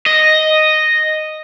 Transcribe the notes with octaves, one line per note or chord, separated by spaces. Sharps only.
D#5